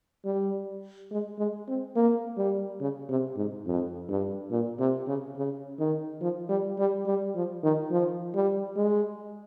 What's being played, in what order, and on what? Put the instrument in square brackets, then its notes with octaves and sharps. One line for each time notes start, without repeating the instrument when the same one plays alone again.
[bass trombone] G3
G#3
G#3
C4
A#3
G3
C#3
C3
G#2
F2
G2
A#2
C3
C#3
C#3
D#3
F3
G3
G3
G3
F3
D#3
F3
G3
G#3